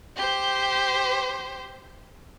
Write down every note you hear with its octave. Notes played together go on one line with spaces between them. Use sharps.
G4 C5